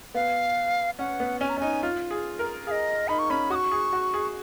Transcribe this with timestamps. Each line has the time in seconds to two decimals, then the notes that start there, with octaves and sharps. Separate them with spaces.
0.14 B3 F5
0.99 C#4 F#5
1.20 B3
1.41 C#4 G#5
1.49 A#5
1.57 C#4 D#4 G#5
1.83 F4
2.11 G#4
2.39 A#4
2.67 G#4 F5
2.71 D#5
3.08 D#4 B5
3.19 C#6
3.30 C#4 B5
3.50 F#4 D#6
3.55 C#6
3.71 G#4
3.93 F#4
4.14 G#4